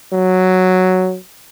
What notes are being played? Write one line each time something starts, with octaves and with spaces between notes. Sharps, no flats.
F#3